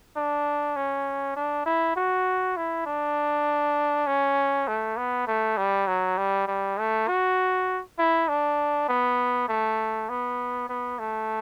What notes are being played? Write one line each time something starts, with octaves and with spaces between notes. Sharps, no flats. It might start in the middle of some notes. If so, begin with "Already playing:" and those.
D4
C#4
D4
E4
F#4
E4
D4
C#4
A3
B3
A3
G3
F#3
G3
G3
A3
F#4
E4
D4
B3
A3
B3
B3
A3